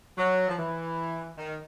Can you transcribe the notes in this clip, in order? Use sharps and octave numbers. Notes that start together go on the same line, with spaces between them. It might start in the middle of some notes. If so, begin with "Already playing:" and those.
F#3
F3
E3
D#3